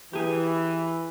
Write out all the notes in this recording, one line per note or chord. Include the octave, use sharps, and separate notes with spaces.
E3 G4 G#4